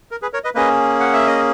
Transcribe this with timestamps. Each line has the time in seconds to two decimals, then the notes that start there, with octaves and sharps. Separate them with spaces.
0.11 A#4
0.22 G#4 B4
0.33 A#4 C#5
0.44 B4 D#5
0.55 A#3 C#4 G#4 B4 D#5
1.00 F#5
1.13 E5
1.27 D#5